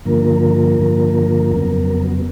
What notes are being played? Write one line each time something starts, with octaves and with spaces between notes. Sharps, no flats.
G2 D3 F3 A#3 A#4
G2 D3 F3 A#3
F2 C#3 F#3 B3